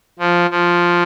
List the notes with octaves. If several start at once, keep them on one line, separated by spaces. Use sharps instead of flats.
F3
F3